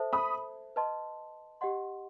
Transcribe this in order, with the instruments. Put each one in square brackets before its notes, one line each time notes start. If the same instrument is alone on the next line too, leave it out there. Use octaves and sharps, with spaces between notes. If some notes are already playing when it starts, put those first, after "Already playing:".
Already playing: [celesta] A4 C5 E5 A5
[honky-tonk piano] B5 D#6
[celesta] B4 D#5 A5 C6
G4 D#5 F#5 C6